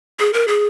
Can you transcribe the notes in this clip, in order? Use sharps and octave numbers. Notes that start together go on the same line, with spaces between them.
G#4
A#4
G#4